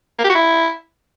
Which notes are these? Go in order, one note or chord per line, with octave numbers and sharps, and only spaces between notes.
A#3
G4
F#4
E4